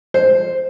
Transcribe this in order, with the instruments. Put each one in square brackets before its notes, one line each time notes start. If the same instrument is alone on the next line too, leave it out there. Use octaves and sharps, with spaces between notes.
[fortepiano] C5